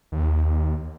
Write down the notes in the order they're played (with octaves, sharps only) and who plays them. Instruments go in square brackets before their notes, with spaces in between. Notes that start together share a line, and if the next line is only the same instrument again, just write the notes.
[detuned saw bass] D#2